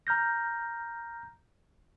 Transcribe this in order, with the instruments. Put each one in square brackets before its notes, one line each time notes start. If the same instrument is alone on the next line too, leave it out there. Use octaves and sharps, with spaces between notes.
[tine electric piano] A#5 F6 G6 A#6